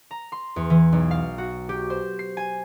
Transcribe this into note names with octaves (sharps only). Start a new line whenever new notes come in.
A#5
C6
E2
E3
B1
F5
F#4
G4
C5
C7
G#5